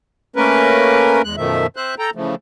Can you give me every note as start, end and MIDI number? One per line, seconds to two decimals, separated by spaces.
0.36 1.22 57
0.36 1.22 58
0.36 1.22 61
0.36 1.22 70
0.36 1.22 71
1.24 1.36 40
1.24 1.36 56
1.24 1.36 90
1.37 1.67 42
1.37 1.67 47
1.37 1.67 51
1.37 1.67 53
1.37 1.67 57
1.37 1.67 76
1.76 1.95 60
1.76 1.95 72
1.76 1.95 76
1.76 1.95 90
1.99 2.10 69
1.99 2.10 79
1.99 2.10 82
2.15 2.35 49
2.15 2.35 52
2.15 2.35 53
2.15 2.35 57